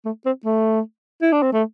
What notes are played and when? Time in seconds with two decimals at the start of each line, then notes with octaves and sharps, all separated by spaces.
0.05 A3
0.26 C4
0.45 A3
1.22 E4
1.32 D4
1.42 C4
1.53 A3